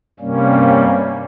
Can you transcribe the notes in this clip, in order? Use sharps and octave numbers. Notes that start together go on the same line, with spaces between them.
G2 C3 G3 A#3 C#4